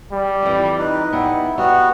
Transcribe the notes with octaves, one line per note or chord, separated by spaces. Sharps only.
G3
F2 E3
D#4 B4
G3 B3 E4
G3 B3 F#4